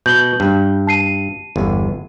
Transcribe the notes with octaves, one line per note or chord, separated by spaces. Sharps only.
B2 G6 F#7 G7
G2
A5 C7 D#7
G1 E2